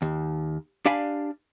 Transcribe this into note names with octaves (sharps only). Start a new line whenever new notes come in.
D#2
D4 G4 D5 F5 G#5 B5